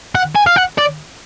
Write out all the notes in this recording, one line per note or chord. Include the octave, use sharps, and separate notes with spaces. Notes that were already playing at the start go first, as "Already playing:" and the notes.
F#5
G#5
F5
F#5
D5